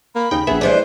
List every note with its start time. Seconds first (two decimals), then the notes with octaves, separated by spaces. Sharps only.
0.15 A#3 B5
0.31 D#2 C#3 D#4 G5
0.47 A#1 B3 G#4 E5
0.61 E3 G3 D4 C5